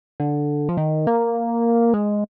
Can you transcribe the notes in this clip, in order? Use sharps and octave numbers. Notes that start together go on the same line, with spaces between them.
D3
F3
D#3
A#3
G#3